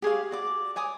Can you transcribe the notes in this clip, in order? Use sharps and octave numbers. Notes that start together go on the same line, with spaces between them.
G4 G#4 C#5 F5
F#4 D5 D6
C#5 G#5 D6 D#6